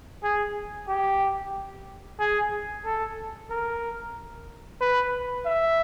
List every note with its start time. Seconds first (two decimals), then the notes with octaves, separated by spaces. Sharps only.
0.24 G#4
0.89 G4
2.20 G#4
2.85 A4
3.50 A#4
4.81 B4
5.46 E5